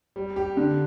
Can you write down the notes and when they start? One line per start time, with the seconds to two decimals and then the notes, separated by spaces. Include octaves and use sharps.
0.16 G3
0.36 G4
0.57 D3